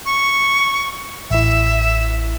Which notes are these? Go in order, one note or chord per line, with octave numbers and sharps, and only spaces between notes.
C#6
A1 E4 E5